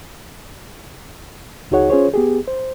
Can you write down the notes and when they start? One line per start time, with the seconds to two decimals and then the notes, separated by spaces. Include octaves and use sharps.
1.71 C#2 D#4 F#4 G#4 C#5 F#5
1.90 C#4 F4 G#4 C5 C#5
2.14 B3 G4 G#4
2.48 C5